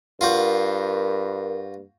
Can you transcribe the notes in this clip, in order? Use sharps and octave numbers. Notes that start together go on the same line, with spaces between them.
G2 F4 F#4 A#4 C5